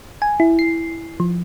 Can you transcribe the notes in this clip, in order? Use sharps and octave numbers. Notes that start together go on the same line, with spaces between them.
G#5
E4
C7
F3